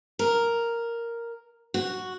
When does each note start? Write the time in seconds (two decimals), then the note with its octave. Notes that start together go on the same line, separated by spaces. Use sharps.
0.19 A#4
1.74 F#4